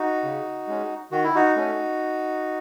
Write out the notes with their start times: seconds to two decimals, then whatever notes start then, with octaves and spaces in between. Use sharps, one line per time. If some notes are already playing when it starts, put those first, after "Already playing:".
Already playing: D#4 F#4
0.23 C#3
0.68 G#3 C#4
1.11 D#3 F#4
1.24 E4
1.35 D#4 F#4
1.56 A3 C#4